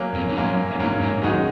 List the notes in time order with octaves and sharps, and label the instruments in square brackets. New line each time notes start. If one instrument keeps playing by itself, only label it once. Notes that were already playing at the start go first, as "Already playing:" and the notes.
Already playing: [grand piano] F#3 A#3 C#4
[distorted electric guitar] F2
G#2
[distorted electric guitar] F#2 [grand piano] F#3 A#3 C#4
[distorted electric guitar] G#2 [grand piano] F#3 A#3 C#4
[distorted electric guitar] G#2
[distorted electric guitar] F#2 [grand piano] D#3 G#3 D#4 F#4 C#5